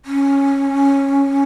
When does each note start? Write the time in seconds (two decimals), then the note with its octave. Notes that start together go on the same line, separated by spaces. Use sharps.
0.05 C#4